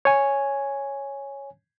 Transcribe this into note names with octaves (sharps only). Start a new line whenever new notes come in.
C#5 G#5